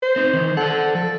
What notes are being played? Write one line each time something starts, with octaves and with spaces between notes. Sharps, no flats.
C5
C4 D#4
D#3 E3
A4 D5 F#5
F3 A4